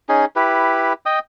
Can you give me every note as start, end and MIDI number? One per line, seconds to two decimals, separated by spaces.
0.09 0.25 61
0.09 0.25 63
0.09 0.25 68
0.36 0.93 64
0.36 0.93 67
0.36 0.93 71
1.06 1.19 75
1.06 1.19 79
1.06 1.19 87